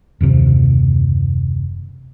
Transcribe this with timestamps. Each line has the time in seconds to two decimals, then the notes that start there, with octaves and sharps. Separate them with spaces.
0.21 F#1 D#2 C3